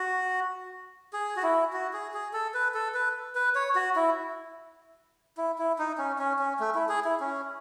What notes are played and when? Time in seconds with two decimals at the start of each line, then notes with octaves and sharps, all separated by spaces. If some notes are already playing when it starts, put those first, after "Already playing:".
Already playing: F#4
1.13 G#4
1.36 F#4
1.43 E4
1.73 F#4
1.93 G#4
2.14 G#4
2.33 A4
2.54 B4
2.74 A4
2.94 B4
3.35 B4
3.55 C#5
3.75 F#4
3.96 E4
5.37 E4
5.58 E4
5.78 D#4
5.98 C#4
6.19 C#4
6.39 C#4
6.60 A3
6.75 E4
6.89 G#4
7.05 E4
7.20 C#4